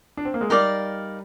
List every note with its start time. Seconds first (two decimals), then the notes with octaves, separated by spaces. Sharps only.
0.17 D4
0.25 C4
0.34 A#3
0.41 G#3
0.50 G3 D#4 A#4 D5 F5